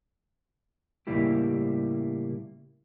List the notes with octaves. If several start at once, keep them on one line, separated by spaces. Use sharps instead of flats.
A2 C#3 G3 A#3 E4 G4